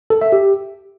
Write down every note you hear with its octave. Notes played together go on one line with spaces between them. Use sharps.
A4
E5
G4